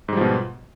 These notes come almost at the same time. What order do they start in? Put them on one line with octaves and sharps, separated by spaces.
G#2 G3 F3 B2